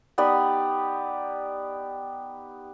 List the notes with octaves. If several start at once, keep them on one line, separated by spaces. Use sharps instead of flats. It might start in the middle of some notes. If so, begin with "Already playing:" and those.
B3 D#4 G4 D5